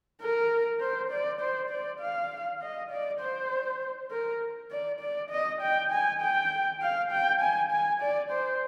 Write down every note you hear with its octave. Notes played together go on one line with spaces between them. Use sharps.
A#4
C5
D5
C5
D5
F5
D#5
D5
C5
A#4
D5
D5
D#5
G5
G#5
G5
F5
G5
G#5
G#5
D5
C5